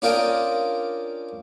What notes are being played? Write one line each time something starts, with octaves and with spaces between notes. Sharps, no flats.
C#4 D4 F4 A#4 D#5 G5